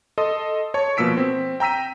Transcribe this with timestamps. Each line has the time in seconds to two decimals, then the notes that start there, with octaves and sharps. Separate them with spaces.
0.18 A4 D#5 C6 D#6
0.74 C#5 A5 C#6
0.97 B2 F3 A#3 E6 B6 D7
1.17 C4
1.60 G5 A#5 E6 B6 D#7